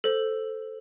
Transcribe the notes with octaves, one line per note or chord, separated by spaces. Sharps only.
A4 C5